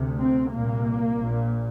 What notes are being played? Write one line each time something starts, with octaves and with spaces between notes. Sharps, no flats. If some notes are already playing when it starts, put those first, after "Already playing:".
Already playing: D2 C3
C4
C2 A#2 A#3
A#1 A#2